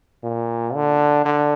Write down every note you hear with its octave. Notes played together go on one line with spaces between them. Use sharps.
A#2
D3
D3